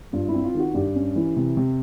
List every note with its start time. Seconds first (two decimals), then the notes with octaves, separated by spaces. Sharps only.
0.13 G2 F4
0.28 E4
0.34 C4
0.44 F4
0.54 D#3 F#4
0.74 G2 G4
0.95 C#4
1.16 E3
1.37 C3
1.57 C3